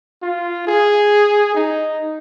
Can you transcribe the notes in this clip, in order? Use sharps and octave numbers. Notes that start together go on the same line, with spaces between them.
F4
G#4
D#4